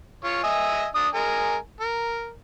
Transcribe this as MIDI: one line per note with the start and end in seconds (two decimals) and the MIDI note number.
0.24 0.43 65
0.24 0.43 73
0.44 0.86 75
0.44 0.86 76
0.44 0.86 80
0.95 1.08 62
0.95 1.08 87
1.15 1.56 56
1.15 1.56 70
1.15 1.56 80
1.81 2.30 70